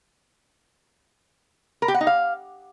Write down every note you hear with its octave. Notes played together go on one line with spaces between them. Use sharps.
A#4
G4
F#5
D#4
F5